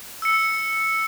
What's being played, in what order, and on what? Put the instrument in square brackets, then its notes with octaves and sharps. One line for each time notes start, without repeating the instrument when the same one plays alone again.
[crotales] E6 C#7